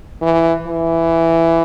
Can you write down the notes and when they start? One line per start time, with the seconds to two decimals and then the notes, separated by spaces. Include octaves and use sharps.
0.22 E3
0.67 E3